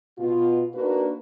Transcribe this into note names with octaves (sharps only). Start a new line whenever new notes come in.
B2 F4
A#3 D4 D#4 F#4 A#4 B4